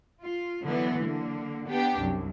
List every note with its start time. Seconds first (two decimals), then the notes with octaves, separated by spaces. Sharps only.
0.22 F4
0.64 D3 E3 F#3 B3
1.00 D3 A#3
1.67 B3 D4 G4
1.98 C2 F#2